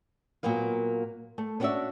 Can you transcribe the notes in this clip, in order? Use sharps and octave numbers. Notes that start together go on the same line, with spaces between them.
A#2 F#3 A#3 B3 F5
A3
B3 C#4 D4 F#4 D5 E5